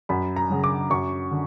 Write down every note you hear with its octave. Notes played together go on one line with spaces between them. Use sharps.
F#2 B5
A#5
C#3 F#3
D6
F#2 C#6
D3